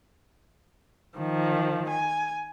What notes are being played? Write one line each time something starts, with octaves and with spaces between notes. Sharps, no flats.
D#3 F3
G#5